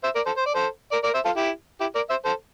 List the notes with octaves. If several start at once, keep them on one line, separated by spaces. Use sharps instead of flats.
C5 E5
A#4 D5
A4 C5
C5
D5
A4 C5
A#4 D5
A#4 D5
C5 E5
F4 A4
E4 G4
E4 G4
A#4 D5
C5 E5
A4 C5